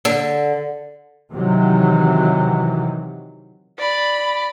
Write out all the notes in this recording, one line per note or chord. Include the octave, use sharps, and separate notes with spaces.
D3
C3 D#3 E3 F#3
D5 B5